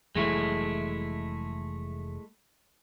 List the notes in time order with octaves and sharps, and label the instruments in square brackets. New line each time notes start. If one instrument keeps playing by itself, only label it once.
[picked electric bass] F1 E3 F#3 [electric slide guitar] G#3 A3 E4